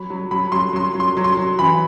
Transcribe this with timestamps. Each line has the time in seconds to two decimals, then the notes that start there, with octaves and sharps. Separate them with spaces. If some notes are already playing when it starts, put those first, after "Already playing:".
Already playing: F#3 B5
0.10 F#3
0.31 F#3 B5
0.52 F#3 C6
0.73 F#3 C6
0.94 F#3
1.00 C6
1.17 F#3
1.24 C6
1.37 F#3
1.59 E3 B5